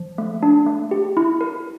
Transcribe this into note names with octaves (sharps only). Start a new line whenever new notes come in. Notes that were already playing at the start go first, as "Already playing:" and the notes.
Already playing: F3
A3
D4
A3
G4
E4
A#4